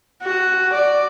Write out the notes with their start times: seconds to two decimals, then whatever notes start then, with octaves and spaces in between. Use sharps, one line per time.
0.23 F#4
0.73 D5